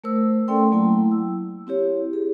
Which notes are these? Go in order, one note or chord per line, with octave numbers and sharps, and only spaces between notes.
A3 A#4 C5 E6
A3 C#4 A4 D5 G5 C6
F#3 A3 A#3 E4 G5
E6
C4 E4 G4 C#5
G#4